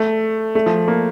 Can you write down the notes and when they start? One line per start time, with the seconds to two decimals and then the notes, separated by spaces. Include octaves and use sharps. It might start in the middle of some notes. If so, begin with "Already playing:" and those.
Already playing: A3
0.55 A3
0.66 F3
0.88 A#3